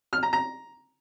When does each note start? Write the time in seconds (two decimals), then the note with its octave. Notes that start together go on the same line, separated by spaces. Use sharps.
0.13 F6
0.23 A#5
0.33 A#5